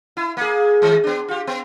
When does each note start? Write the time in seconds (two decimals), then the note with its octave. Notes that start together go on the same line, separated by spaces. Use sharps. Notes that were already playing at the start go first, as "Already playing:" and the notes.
0.17 E4
0.37 A#3 G#4
0.82 D#3 G#3
1.04 B3 D4
1.28 F4 G4
1.47 B3